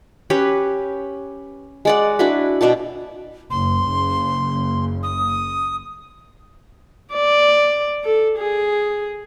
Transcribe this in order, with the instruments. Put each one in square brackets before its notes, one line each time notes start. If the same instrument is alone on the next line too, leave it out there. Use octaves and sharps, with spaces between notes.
[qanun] C#4 G4 B4 C#5
G#3 D5 F#5
D4 E4 F#4 B4
B2 D4 F#4 A5
[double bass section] F#1 [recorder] C6
[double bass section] F#1 C#3
[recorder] D#6
[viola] D5
A4
G#4